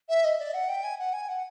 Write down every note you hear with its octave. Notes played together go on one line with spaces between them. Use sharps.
E5
D#5
D5
F#5
G5
G#5
F#5
G#5
F#5